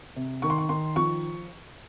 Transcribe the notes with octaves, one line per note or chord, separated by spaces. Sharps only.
C3
D#3 C#6
C6
C#6
D#3 C6
F3 C#6